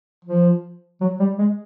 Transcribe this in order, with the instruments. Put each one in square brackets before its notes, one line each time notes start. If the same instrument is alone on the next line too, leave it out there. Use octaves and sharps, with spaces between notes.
[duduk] F3
F#3
G3
G#3